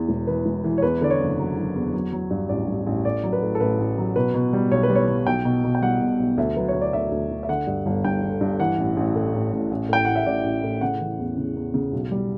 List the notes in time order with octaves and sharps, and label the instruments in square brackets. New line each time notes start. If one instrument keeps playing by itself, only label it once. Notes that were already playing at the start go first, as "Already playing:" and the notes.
Already playing: [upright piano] E2 E3
E1
E3 B4
E1
E3
C#5
E2 B4
D3 D5
C#5
F#1
F#3
F#3
E2
F#3
F#3
G2
A1 D5
G2
A1
A2 D5
F#3
B4
A2
A4
A1 B4
A1
F#3
B2 B4
B2
G3
B1 C#5
B4
G3
C#5
G3
B1 G5
B2
B2
G5
G3 F#5
B2
B1
D2 E5
F#3 B4
C#5
D2
D5
D2 E5
D2
D2
E5
D3 F#5
G2
G1
G2 G5
D3
G2
E3 F#5
A1
A1
A2
A1
A1
A1
A2 G5
A1 F#5
E5
A1 D5
A1
A2
C#3 F#5
E3
E2
C#3
E2
C#3
B1
G3